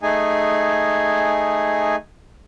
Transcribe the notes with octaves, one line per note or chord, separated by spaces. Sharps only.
A3 D#4 G#4 G#5